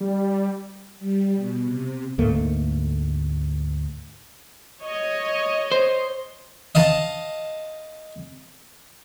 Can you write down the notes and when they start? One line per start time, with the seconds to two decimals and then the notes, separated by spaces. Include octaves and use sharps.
0.01 G3
1.00 G3
1.36 B2
1.66 C3
2.18 D2 G#2 A3 A#3
4.83 C#5 D#5
5.72 C5
6.75 D#5 F5 A5